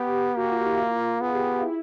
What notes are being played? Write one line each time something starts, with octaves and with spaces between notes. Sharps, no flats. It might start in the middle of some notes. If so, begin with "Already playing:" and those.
Already playing: B3 G4
A#3 F#4
F4
E4
F4
B3 G#4
G4
G4
E4